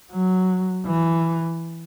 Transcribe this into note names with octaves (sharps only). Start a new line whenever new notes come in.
F#3
E3